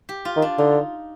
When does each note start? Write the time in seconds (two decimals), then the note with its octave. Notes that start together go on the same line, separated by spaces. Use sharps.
0.09 G4
0.25 F4
0.36 D#3
0.42 D4
0.58 D3 D#4